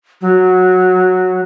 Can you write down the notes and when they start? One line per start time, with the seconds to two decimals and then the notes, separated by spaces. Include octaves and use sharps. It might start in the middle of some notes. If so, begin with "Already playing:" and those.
0.21 F#3